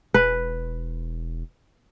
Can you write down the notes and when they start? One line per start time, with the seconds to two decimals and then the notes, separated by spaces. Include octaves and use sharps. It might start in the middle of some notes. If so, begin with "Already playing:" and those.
0.14 E1 B4